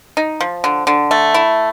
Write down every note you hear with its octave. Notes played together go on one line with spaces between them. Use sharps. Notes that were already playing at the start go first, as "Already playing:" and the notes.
D#4
F3
D3
D3
A3
E4